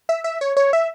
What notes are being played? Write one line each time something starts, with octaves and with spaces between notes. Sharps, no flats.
E5
E5
C#5
C#5
E5